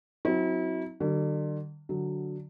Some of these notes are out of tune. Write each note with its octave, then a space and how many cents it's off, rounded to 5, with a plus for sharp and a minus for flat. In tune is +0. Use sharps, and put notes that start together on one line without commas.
F#3 +0 C4 +0 E4 -35
D3 +40 G3 -40
D3 +0 F#3 +0